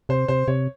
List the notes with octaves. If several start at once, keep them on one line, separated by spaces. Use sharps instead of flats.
C3 C5
C3 C5
C3 C#5